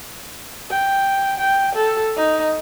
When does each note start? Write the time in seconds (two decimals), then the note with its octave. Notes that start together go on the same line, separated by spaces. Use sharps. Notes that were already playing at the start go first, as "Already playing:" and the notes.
0.71 G5
1.40 G5
1.75 A4
2.17 D#4